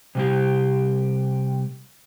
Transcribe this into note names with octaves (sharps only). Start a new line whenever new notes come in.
C3 G3 G4